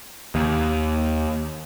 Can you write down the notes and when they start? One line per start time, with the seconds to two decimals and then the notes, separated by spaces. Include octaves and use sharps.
0.35 D#2